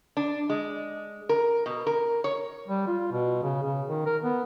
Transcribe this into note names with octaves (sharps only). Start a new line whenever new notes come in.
D4
G#3
A#4
B2
A#4
C#5
G3
F4
B2
C#3
C#3
D#3
A#4
B3